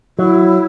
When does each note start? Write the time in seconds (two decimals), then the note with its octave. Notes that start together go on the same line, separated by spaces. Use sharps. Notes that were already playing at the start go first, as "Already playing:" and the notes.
0.18 F#3 E4